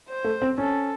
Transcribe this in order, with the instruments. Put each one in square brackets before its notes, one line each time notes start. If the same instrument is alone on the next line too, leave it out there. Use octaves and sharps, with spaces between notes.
[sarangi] C5
[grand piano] A3
C4
[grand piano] C#4 [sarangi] A4